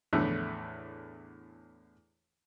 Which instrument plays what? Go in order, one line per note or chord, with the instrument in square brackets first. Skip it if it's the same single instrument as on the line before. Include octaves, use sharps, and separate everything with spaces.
[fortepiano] E2 A2 D3 A3